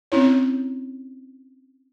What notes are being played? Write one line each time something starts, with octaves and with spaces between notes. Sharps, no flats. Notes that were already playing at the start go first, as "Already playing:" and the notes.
C4 C#4 E4 C#5